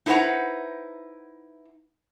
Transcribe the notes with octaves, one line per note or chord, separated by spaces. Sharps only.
D#4 E4 B4 C5 F#5 A#5